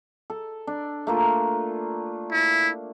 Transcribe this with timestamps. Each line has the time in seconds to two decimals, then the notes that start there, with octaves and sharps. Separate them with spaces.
0.30 A4
0.67 D4
1.07 A3 A#3 F4
2.32 E4